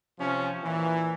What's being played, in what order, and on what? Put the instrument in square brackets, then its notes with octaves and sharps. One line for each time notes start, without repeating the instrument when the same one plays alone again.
[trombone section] C3 F3 C#4
A#2 E3